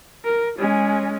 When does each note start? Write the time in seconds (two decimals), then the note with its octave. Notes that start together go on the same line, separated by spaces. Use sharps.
0.25 A#4
0.59 G#3 C#4